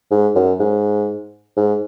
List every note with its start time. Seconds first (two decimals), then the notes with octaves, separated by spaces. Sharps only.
0.11 G#2
0.35 F#2
0.60 G#2
1.57 G#2